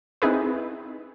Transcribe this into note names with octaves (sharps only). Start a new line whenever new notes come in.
C4 D#4 E4 G#4 B4